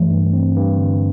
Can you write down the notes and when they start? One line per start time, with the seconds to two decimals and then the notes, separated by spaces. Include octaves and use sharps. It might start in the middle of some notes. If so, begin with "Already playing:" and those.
Already playing: G2 E3 G3 A3
0.11 G2
0.33 C4
0.56 G2
0.77 D3